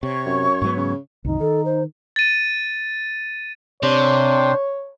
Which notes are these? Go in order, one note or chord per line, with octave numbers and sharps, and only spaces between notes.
C3 C#5 C#6
F#2
G#2 F#3 B3
C#3
C2 F#2 D#3 D#4
D#3 A4
C5
A6 D#7
C3 D4 C5 C#5